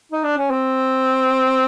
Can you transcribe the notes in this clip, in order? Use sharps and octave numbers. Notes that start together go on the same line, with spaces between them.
D#4
D4
C#4
C4